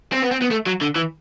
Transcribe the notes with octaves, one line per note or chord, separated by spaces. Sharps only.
C4
B3
C4
B3
A3
F#3
D3
E3